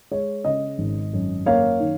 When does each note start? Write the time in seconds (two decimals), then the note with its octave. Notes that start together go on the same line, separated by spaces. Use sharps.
0.11 G#3 C#5
0.45 C#3 D#5
0.78 G#1
1.13 F#2
1.46 A#3 C#5 F5
1.80 D#3